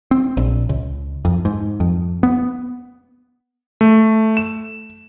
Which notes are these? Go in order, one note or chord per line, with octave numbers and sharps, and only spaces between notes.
C4
A#1
C#2
F2
G#2
F2
B3
A3
E7